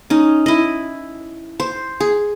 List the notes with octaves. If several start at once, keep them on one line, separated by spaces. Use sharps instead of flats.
C#4 D#4
E4 D#5
C5
G#4